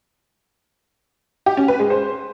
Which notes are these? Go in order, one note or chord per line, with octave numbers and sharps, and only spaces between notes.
G4
C#4
B4
G#3
C5